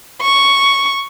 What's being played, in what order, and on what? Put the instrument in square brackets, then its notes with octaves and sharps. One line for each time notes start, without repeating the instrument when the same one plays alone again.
[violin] C#6